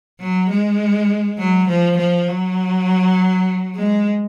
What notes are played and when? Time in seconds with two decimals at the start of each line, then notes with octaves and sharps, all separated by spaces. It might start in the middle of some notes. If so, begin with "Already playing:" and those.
0.20 F#3
0.50 G#3
1.38 F#3
1.69 F3
1.98 F3
2.28 F#3
3.76 G#3